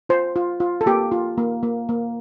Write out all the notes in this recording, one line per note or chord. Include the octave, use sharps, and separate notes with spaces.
F4 C5
F4
F4
A4
A#3 G4
F4
A#3
A#3
A#3